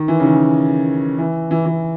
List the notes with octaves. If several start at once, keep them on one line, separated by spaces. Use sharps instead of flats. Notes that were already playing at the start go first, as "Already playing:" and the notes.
Already playing: D#3
E3
C#3
D#3
E3
E3
E3